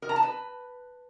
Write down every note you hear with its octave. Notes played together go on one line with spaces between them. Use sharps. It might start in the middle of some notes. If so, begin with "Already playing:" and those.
A#4
A#5
A5
B4